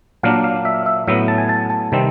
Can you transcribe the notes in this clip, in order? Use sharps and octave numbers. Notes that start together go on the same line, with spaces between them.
A#2 F#3 A#3 D4 F5
F5
E5
E5
A2 F#3 B3 E5
A5
G#5
A5
A5
C3 D#3 G3 C4